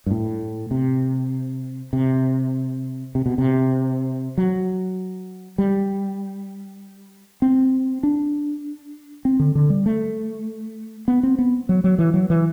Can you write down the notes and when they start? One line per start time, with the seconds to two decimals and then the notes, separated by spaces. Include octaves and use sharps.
0.06 G2
0.11 A2
0.71 C3
1.93 C3
3.15 C3
3.26 B2
3.38 C3
4.38 F#3
5.58 G3
7.42 C4
8.03 D4
9.25 C4
9.39 D3
9.55 D3
9.70 G3
9.86 A3
11.08 B3
11.23 C4
11.39 B3
11.69 F#3
11.84 F#3
11.98 E3
12.14 F#3
12.30 E3